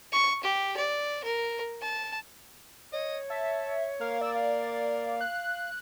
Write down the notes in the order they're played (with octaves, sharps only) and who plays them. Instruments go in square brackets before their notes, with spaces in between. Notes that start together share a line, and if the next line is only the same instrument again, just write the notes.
[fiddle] C#6
G4
D5
A#4
A5
[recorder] C#5 [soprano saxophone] D#5
[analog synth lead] E5 [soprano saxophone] A5
[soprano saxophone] A#3 [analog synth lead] F5
[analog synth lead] D5 [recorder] E6
[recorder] F5
[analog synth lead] F#6